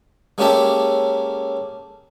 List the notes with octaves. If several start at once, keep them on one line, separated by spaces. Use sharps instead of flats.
G#3 A#3 C#4 G4 A4 E5